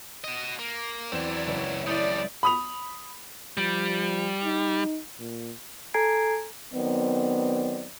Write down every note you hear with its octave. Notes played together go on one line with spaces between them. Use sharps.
F#4 D#5
A#3
E2 F#3 C4 E4 D5
F#1 C#2 E5
A2 G3 E4 D5 D#6 G6
B5 D#6 F7
F3 G3
D#4
A#2
A4 G#5 A#5 G#6 C7 D7
D#3 F#3 B3 C4 D5